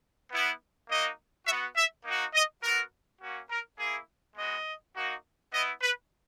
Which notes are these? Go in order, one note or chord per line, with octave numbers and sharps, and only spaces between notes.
B3 E4
A#3 D#4 F#4 D#5
B3 F#4 E5
E5
A#3 D#4 F#4
D#5
B3 F#4 A#4
A#3 C#4 F#4
A#4
A#3 E4 G#4
G#3 B3 F#4 D#5
A#3 D#4 F#4
B3 E4 D#5
B4